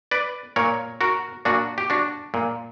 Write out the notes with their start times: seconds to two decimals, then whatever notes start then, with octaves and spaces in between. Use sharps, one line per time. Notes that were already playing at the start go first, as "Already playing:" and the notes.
0.11 B4 D5
0.56 A#2 A#4 C#5
1.01 F#4 A#4
1.45 A#2 D4 F#4
1.78 G4
1.90 D4 F#4
2.34 A#2